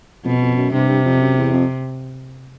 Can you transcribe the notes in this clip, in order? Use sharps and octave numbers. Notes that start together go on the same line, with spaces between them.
F2 B2
F2
F#2
G2 C3
G2
F2
F#2
E2
F2